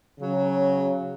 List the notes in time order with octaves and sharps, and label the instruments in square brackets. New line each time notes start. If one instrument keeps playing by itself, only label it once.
[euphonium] C#3 [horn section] F#3